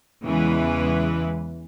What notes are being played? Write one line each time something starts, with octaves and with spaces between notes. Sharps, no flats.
E2 C#3 E3 G#3 B4